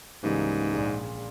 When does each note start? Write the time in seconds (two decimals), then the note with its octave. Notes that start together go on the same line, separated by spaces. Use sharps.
0.23 C#2 G#2 C#3 E3 G3 A#3
0.72 A#1 A#2 G#3